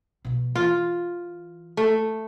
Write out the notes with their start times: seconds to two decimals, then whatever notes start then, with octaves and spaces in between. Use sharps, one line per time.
0.25 B2 F#3
0.55 E3 F4
1.77 A3